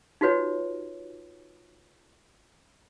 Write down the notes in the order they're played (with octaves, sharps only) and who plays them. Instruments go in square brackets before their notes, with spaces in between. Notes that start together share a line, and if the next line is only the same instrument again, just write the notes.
[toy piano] D#4 F4 F#4 B4 C#5